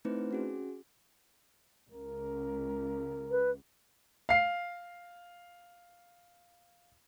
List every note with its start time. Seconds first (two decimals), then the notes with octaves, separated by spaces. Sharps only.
0.05 A3 C4 D#4 E4 B4 C5
0.31 C#4 F#4 G#4
1.92 C#2 A#4
3.31 B4
4.29 F5 C7